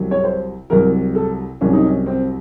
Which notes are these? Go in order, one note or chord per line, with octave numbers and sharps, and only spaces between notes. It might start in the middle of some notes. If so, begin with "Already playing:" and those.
Already playing: C2 C3 F#3
C#5
C5
C2 C3 F#3 A#4
A4
C2 C3 F#3 C#4
D#4
C#4
C4